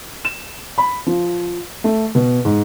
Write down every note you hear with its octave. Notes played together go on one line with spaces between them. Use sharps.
E7
B5
F3
A3
B2
G#2